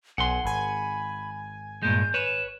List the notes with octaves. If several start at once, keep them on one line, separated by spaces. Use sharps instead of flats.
B1 F#5 G#5 C6
G#1 G#5 B5
G2 A#2 G#3 G6
B4 C#5 E7